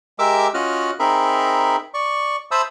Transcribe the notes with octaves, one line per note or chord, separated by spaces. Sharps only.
G#3 G4 A#4 E5 D6 E6
C#4 F4 F#4 D#5 F6 F#6
C4 D#4 G#4 A#4 E5 B5
D5 C#6
C5 E5 A5 B5 D#6 E6